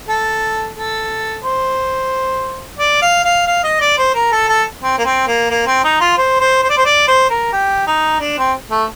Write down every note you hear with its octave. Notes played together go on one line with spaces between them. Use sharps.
A4
A4
C5
D5
F5
F5
F5
D#5
D5
C5
A#4
A4
A4
C4
A#3
C4
A#3
A#3
C4
D#4
F4
C5
C5
C5
D5
C5
D5
C5
A#4
G4
D#4
D4
C4
A3